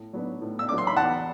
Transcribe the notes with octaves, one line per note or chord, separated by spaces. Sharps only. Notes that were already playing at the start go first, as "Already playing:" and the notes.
Already playing: A2
F#3 B3 D4
A2
E6
F#3 B3 D4 D6
C6
B5
E2 F#5 A5